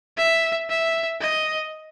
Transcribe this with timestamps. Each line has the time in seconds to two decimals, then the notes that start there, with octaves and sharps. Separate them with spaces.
0.18 E5
0.69 E5
1.21 D#5